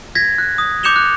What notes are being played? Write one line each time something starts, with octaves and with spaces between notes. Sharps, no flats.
G#6 A#6 B6
F#6
D#6
D6 G6 C#7 E7 F7 G7
F#6